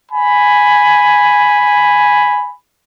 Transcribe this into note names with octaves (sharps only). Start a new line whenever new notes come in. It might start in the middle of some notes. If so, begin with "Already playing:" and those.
G#5 B5